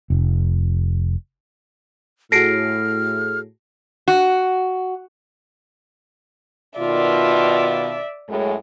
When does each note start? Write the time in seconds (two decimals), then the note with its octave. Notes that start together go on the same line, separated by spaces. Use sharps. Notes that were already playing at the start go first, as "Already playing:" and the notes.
0.10 F1
2.32 A2 F#4 G#4 A4 F6 A#6 C7 D7
4.08 F#4
6.79 B2 D#3 F4 D5 E5
8.28 F#2 A2 G#3